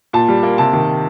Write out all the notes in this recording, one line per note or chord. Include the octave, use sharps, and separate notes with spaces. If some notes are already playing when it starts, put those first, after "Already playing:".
A#2 A5
G3
A#3
C3 A5
D#3